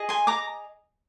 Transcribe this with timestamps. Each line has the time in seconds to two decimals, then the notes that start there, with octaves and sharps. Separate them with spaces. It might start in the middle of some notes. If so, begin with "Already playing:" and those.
Already playing: G#4 D#5
0.09 G#5 C6
0.27 A#5 D6